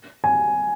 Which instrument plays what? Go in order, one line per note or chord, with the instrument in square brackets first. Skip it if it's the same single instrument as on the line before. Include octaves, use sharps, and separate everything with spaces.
[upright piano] G#5